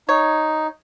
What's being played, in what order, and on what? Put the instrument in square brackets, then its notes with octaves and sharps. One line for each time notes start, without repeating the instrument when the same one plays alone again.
[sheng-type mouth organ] D#4 [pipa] C#5